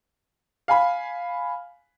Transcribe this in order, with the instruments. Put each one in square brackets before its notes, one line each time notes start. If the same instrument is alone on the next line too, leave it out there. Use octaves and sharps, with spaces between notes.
[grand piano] F5 G#5 B5